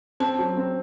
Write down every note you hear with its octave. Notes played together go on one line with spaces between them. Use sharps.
C4 A5
F#3
C4